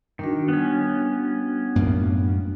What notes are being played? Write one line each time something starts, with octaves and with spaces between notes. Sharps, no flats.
D#3 G3 D4 F#4
B3 C#4
F#2 A2 A#3